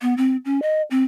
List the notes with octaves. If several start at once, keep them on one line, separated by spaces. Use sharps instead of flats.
B3
C4
C#4
D#5
C4